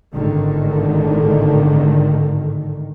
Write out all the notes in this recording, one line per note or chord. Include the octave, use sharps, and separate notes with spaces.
G#1 A2 D3 D#3